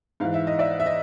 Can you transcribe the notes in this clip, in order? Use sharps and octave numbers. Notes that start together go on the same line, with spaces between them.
G#2 E3 F5
E5
D#5
D5 E5
E5
D#5